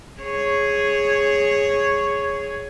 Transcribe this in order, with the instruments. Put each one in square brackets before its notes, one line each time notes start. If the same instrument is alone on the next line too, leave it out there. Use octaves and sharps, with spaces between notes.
[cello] G#4 C#5